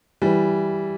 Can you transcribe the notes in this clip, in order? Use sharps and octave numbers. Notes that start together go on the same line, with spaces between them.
E3 G3